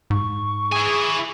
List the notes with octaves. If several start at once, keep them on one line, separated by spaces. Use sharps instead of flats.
G#2 C#6
E4 G#4 G#5